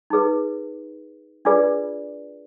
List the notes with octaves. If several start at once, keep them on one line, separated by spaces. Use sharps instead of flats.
D#4 G#4 B4
D4 F4 G#4 B4 D5